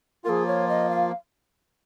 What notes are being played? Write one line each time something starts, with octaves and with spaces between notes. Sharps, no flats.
F3 A#3 F4 G#4 A#4
C#5
D#5
F5